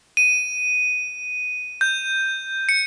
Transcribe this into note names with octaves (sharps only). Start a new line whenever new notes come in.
D#7
G6
C#7